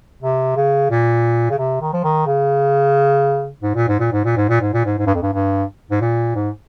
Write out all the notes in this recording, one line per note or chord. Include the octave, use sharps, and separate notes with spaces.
C3
C#3
A#2
C#3
C3
D#3
F3
D#3
C#3
G#2
A#2
G#2
A#2
G#2
A#2
G#2
A#2
G#2
A#2
G#2
G#2
G2
F2
G2
G2
G#2
A#2
G#2